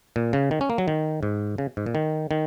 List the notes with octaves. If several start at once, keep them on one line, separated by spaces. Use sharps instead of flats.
A#2
C#3
D#3
C#4
A#3
F#3
D#3
G#2
C#3
G#2
A#2
D#3
D#3